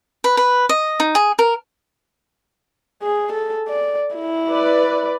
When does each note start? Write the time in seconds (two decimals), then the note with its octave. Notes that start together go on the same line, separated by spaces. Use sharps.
0.24 B4
0.37 B4
0.69 D#5
1.00 D#4
1.15 G#4
1.39 A#4
3.02 G#4
3.32 A4
3.68 D5
4.15 E4
4.49 B4 D5